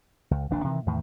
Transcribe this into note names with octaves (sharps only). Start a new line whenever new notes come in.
C#2
D#1 A#1 D4
C3 D#3 E3
E2 A2 D#3